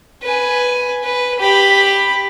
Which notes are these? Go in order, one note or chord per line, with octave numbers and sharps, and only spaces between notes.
B4 G#5
B4
G4 B5